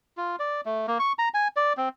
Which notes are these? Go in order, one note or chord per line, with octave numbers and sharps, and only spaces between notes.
F4
D5
A3
A#3
C#6
A#5
G#5
D5
C4